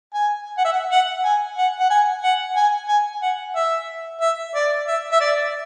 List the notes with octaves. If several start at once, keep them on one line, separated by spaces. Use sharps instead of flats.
G#5
F#5
E5
F#5
F#5
G#5
F#5
F#5
G#5
F#5
G#5
G#5
F#5
E5
E5
D5
E5
E5
D5